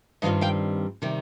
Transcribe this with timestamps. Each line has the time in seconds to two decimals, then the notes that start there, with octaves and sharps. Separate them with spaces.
0.22 G2 D#3 G3 C4 F4 D#5 F5
0.41 F5 G5
1.02 C3 D#3 G3